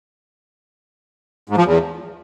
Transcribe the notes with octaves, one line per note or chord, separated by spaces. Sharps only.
G#2
F3
E2